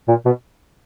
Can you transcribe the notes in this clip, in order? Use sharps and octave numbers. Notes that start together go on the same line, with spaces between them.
A#2
B2